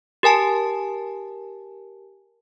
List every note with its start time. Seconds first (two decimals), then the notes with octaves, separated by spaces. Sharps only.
0.23 G4 A#4 G#5 A5